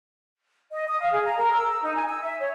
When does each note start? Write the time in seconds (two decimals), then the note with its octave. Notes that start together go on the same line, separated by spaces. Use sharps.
0.71 D#5
0.87 D#6
1.01 F5
1.13 G#4
1.25 A#5
1.38 A#4
1.52 E6
1.82 D#4
1.95 G#5
2.08 E6
2.22 E5
2.40 C#5